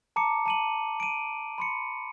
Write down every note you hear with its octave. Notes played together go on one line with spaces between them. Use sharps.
A5 A#5 D6 C#7
A5 D#7 F#7
D7 D#7
B5 C6 C#7